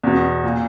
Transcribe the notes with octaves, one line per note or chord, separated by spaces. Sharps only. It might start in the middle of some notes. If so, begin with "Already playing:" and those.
E2 B2
A#2